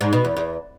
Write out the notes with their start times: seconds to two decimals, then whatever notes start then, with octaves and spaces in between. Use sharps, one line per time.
0.01 G#2
0.13 B2
0.25 E2
0.37 E2